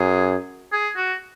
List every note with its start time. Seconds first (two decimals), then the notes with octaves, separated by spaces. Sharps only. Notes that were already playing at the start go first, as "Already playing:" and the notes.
Already playing: F#2 G#4
0.72 G#4
0.96 F#4